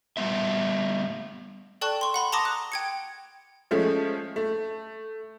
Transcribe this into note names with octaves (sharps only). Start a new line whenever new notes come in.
G3 B3 E5
A4 D5 G5 A5 C#6 F#6
C6 C#6
F#5 B5 C6
A5 A#5 C6 D6 D#6 A#6
F#6
G5 G#6 C#7
F3 G#3 A3 C#4
A3